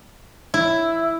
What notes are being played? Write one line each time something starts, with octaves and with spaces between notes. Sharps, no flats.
E4